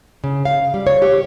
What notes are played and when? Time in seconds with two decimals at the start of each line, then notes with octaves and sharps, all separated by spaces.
0.24 C#3
0.45 F5
0.74 G3
0.87 C#5
1.02 G4